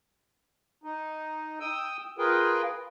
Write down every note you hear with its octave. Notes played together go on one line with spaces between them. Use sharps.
D#4
G5 D#6 E6
F4 G#4 A#4 B4 G5